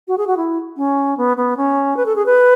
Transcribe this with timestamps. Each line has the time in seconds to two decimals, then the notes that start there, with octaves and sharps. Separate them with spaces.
0.08 F#4
0.18 G#4
0.27 F#4
0.37 E4
0.77 C#4
1.17 B3
1.37 B3
1.57 C#4
1.97 B4
2.06 A4
2.16 G#4
2.26 B4